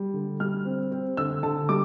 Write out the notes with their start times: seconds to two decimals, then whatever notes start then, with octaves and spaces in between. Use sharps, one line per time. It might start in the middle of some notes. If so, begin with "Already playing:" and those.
Already playing: G3
0.14 D3
0.40 G3 F6
0.65 C4
0.92 C4
1.17 D3 E6
1.43 D3 A5
1.69 G3 D6